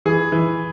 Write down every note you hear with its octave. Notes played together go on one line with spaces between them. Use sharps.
E3 G#4
E3